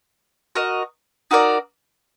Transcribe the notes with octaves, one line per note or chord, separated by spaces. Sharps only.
F#4 A#4 D#5
D#4 F#4 A#4 D5